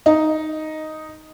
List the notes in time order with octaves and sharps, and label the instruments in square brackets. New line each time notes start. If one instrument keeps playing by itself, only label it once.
[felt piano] D#4